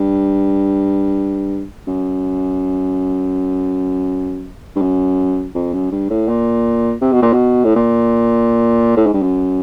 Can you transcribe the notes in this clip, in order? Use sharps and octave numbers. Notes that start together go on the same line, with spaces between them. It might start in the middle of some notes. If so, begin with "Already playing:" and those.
Already playing: G2
F#2
G2
F#2
F2
F#2
G2
A2
A#2
C3
B2
A#2
B2
A2
A#2
A2
G#2
G2
F#2